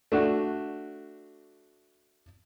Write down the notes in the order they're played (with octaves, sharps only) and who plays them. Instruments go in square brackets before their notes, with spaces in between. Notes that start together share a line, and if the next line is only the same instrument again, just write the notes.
[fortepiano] A3 D4 F#4